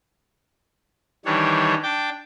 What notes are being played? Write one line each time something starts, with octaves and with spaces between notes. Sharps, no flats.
D#3 E3 G3 D4 C#5
D4 G5 D6